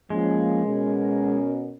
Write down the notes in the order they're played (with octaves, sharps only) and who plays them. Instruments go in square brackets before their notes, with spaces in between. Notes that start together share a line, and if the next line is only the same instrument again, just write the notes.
[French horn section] F3 A#3 C#4 [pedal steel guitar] G#3
[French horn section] B2 C#4 A#4